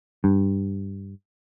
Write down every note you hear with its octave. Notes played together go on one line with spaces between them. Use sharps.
G2